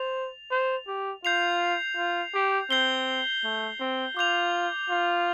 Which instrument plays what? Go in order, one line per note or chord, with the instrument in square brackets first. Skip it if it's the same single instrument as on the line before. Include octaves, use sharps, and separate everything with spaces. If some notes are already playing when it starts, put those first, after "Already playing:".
Already playing: [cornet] C5 [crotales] A6 F7
[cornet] C5
G4
[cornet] F4 [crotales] G6 C7 F7
[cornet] F4
G4
[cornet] C4 [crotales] G6 C7 G7
[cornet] A3
C4
[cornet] F4 [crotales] D6 G6 F7
[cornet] F4